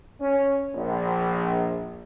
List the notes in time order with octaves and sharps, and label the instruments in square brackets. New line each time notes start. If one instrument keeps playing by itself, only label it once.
[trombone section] C#4
A#1